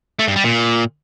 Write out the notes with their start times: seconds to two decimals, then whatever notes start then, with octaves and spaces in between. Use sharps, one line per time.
0.19 A3
0.28 G2
0.36 G3
0.44 A#2